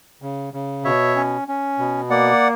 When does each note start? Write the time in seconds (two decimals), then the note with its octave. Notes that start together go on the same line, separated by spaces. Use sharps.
0.22 C#3
0.53 C#3
0.84 B2 C#5 E5
1.16 C#4
1.48 C#4
1.79 B2
2.10 A#3 D5 F#5